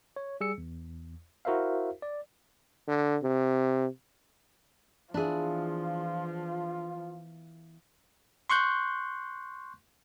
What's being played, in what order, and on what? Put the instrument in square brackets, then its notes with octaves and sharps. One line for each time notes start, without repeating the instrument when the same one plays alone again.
[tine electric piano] C#5
G3 G#4 E6 C#7
E2
E4 F#4 A#4 C5 E5 F5
D5
[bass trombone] D3
C3
[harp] E3 B3 E4 [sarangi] F3 [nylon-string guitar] D4 G#4 [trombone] F4
[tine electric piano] C6 C#6 F#6 G6